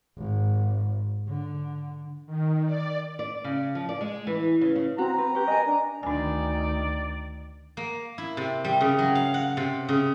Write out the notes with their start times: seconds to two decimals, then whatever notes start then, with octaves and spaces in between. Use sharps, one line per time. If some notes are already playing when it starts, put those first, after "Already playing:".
0.17 G#1
1.28 D3
2.26 D#3
2.65 D5
3.19 D5
3.44 C#3
3.75 F3
3.89 D5
4.01 G#3
4.27 E3
4.61 C#3
4.76 C#3
4.98 C4 F#4 A#5
5.18 C4 B4
5.35 C#4 G4 B4
5.48 A#4 B4 D#5 G#5
5.66 D4
6.03 D2 D#3 D4 D5 G#5
7.77 A#3
8.18 E4
8.37 C3
8.65 G3
8.81 C#3
8.99 F#3
9.15 F5
9.34 F#5
9.57 C3
9.89 C#3